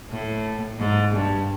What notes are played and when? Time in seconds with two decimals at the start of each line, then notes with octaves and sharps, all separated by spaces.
0.10 A2
0.79 G#2
1.14 G2